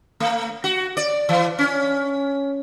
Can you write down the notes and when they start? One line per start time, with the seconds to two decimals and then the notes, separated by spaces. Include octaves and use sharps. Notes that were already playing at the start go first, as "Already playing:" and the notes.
0.20 A3
0.64 F#4
0.97 D5
1.29 E3
1.59 C#4